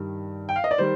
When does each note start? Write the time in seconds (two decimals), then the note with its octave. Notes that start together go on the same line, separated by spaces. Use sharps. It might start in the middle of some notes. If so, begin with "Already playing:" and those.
Already playing: G2 D#3 G3
0.49 G5
0.56 F5
0.64 D#5
0.71 D5
0.78 D#3 G3 C5